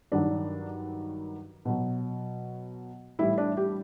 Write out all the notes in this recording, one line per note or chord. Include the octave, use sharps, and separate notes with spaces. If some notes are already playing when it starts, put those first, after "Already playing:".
G2 D#3 F#3 D4
B2 F#3
A2 E3 G3 E4
D4
G4